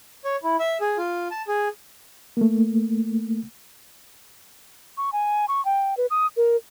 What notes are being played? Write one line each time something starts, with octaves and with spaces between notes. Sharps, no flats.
C#5
E4
E5
G#4
F4
A5
G#4
A3 A#3
C#6
G#5
C#6
G5
B4
D#6
A#4